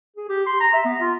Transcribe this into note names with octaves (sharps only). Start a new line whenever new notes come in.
G#4
G4
C6
A#5
E5
B3
F4